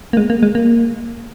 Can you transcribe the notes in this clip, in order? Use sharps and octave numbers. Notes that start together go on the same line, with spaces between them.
A#3
G#3
A#3
G#3
A#3